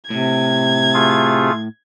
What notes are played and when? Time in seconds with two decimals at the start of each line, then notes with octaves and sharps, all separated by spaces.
0.10 A2 C3 G#6
0.94 A3 F4 G#4